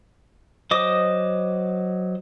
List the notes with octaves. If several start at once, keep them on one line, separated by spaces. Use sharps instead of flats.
F#3 C5 D#5 D6 D#6